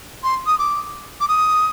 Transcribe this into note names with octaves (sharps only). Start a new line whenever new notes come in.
C6
D#6
D6
D6
D#6